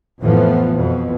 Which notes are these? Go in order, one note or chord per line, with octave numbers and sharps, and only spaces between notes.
F2 A2 E3 F3 B3
F2 B2